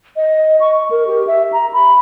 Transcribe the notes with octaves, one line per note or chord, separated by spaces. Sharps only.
D#5
C#6
A#4
G4
E5
A#5
B5